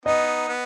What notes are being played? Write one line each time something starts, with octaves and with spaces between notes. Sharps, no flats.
B3 D#4 D#5
B3